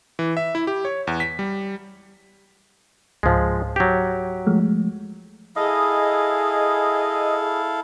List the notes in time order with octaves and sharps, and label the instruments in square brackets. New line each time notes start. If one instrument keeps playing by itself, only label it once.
[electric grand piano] E3
E5
E4
G4
C#5
E2
B6
G3
[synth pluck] C#2 G#2 [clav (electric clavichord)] F3 G#3
[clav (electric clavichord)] F#3 G4
[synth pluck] F3 G#3 A3
[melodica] E4 A4 F5 [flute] G#4 [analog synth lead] D#5